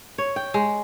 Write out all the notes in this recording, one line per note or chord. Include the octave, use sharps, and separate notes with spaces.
C#5
G5
G#3